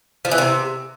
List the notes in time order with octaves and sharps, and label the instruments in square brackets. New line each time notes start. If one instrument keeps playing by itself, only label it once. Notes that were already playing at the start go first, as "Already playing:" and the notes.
[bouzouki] F3
E3
C3